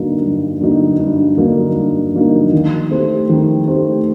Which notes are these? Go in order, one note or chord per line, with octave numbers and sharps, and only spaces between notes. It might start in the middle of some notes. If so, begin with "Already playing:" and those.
Already playing: G2 D3 F#3 A#3 D#4
G2
D3 F#3 A#3 D#4
G2
D3 F#3 A#3 D#4
G2
D3 F#3 A#3 D#4
D#3
A3 C4 G4
D#3
A3 C4 G4